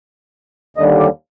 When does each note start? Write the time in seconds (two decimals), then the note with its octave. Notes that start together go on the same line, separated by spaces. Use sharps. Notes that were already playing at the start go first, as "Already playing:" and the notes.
0.77 D#2 D3 G3 D#5
0.99 D5